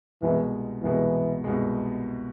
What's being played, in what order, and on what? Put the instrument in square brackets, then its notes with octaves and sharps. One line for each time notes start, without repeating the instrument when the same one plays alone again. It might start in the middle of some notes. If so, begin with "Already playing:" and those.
[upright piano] C2 B2 G#3 [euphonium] E3
[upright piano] C2 B2 G#3 [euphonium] E3
[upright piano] C2 B2 G#3